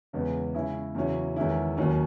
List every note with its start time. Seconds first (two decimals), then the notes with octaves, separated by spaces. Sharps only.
0.13 E2 C#3 G#3 B3
0.54 C#3 G#3 C#4 E4
0.95 E2 C#3 F#3 C#4 E4
1.36 E2 D#3 G#3 C#4 E4
1.77 D#2 D#3 F#3 C#4